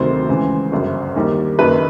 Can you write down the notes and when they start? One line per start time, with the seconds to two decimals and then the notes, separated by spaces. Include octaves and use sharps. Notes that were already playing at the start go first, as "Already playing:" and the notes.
Already playing: D2 C3 D#3 F#3 C5
0.29 C#2 C#3 E3
0.72 G1 F#2 C#3
1.16 D#2 D#3 G3
1.59 F#1 F#2 D#3 B4